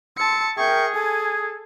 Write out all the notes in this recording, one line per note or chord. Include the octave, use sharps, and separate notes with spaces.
A5 C6 E6 C#7
G#4 A#4 E5 G5 C#6 G6
A4 G#5